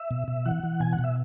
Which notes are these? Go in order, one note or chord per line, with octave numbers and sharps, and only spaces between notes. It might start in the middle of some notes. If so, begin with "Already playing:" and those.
Already playing: E5
B2
B2
E3 F#5
E3
B2 G#5
F#5
B2
E5